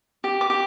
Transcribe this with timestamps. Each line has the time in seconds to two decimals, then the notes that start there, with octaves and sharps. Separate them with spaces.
0.24 G4
0.41 D6
0.50 G4